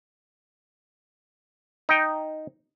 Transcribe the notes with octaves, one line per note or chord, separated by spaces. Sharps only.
D#4 G5